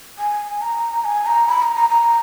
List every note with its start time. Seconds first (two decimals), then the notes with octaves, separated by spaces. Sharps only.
0.19 G#5
0.62 A#5
1.05 G#5
1.26 A#5
1.48 B5
1.62 A#5
1.75 A#5
1.90 A#5